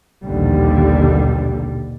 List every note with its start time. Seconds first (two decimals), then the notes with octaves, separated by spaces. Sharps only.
0.24 A#1 D#2 B2 D3 G3